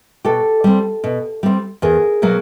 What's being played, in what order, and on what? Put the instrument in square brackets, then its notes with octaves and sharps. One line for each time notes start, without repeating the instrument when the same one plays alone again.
[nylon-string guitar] B2 G4 A4
G3 C4
B2
G3 C4
E2 G#4 A#4
B2 F#3 A#3